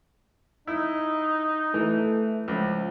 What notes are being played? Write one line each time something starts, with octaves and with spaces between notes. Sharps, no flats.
D#4 E4
E3 A3
C#2 F3